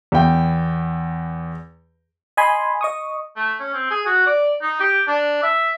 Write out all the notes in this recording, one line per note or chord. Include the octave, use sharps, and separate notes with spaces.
E2 G5
D#5 G#5 B5 C6
D#5 C#6 D#6
A3
C#4
C4
G#4
F#4
D5
D#4
G4
D4
E5